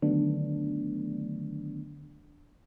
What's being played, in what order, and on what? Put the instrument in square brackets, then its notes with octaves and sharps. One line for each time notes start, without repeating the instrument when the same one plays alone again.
[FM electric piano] D3 D#3 F#3 A3 B3 D4